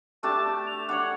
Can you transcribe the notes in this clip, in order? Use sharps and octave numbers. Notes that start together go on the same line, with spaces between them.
A3 D4 G4 A5
F7
D4 C#5 F#5